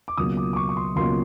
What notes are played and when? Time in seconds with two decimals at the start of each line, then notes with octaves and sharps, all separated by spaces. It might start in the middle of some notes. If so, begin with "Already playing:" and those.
0.08 D6
0.17 C#2 B2 F#3 A#3 D#6
0.37 D6
0.53 D6
0.56 C#6
0.69 C#6
0.77 C6
0.96 C#2 B2 F#3 A#3 C6